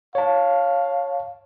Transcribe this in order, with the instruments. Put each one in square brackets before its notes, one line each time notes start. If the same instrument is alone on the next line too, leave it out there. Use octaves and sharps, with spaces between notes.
[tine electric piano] C#5 A5 [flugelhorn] F5